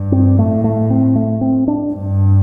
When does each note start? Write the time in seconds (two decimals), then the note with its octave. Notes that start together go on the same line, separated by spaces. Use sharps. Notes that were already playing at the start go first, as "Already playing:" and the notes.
Already playing: G2
0.12 C4
0.38 A2 A3
0.64 A3
0.90 C4
1.15 A3
1.41 C4
1.68 D4
1.94 G2